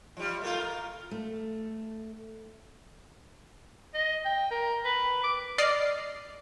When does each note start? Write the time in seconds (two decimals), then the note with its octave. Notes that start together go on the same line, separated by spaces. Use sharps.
0.17 F3 G3
0.41 A3 A#3 F4
0.60 A#4
1.11 A3
3.95 D#5
4.25 G5
4.51 A#4
4.85 B4
5.24 D6
5.58 D5 D#5 F6 C7